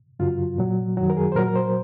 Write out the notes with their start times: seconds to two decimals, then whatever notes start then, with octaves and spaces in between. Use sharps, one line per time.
0.19 F#2 C#3 F#3 F4
0.58 A#2 F#3
0.97 F#2 D#3 F#3 F#4
1.10 A#4
1.17 G#4
1.32 C5
1.36 A#2 F#3 A#4
1.48 A#4
1.56 C5